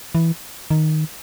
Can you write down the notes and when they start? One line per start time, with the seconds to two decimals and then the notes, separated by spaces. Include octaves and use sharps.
0.15 E3
0.71 D#3